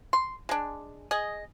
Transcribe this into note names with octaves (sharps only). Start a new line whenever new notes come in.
C6
G#3 D4
G#4 D#5